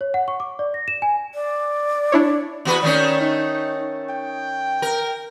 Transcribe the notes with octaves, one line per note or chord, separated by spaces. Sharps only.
C#5
F#5
C#6
D6
D5
A#6
E7
G#5
D5
D4 E4 C#5
E2 F#4 B4
D#3 A3 C#4 D5
D#4
G5
A#4